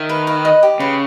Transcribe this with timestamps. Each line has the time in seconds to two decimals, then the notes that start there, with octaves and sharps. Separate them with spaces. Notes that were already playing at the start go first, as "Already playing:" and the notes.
Already playing: D#3 E5
0.09 B4
0.27 B4
0.45 D#5
0.63 G4
0.80 C#3 B4